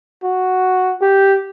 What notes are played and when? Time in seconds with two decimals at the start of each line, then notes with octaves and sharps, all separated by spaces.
0.24 F#4
1.02 G4